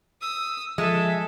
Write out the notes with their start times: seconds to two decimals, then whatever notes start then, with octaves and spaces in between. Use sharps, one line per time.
0.21 D#6 E6
0.78 F3 G#3 A4 E5